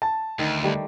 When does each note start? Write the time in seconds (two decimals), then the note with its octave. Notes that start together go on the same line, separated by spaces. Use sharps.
0.02 A5
0.39 D2 D#3
0.63 D#3 G3 A3